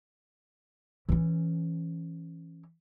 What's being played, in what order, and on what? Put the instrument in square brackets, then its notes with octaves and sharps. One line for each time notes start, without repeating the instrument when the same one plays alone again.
[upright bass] E3 C#4